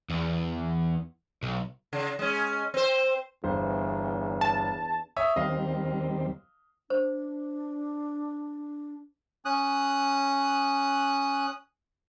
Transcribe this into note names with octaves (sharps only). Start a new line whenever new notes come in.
E2
B1
C#3
G#3 C#4
C4 C5
G1 E2 C5
A5
C#5 E5 D#6
D#2 G3 C4 D#5 F5
D4 C5
C#4 D#6 F#6